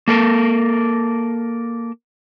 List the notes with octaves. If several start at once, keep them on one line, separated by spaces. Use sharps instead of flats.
A#3 A4 A#4